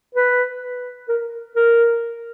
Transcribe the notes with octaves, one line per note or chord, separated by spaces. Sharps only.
B4
A#4
A#4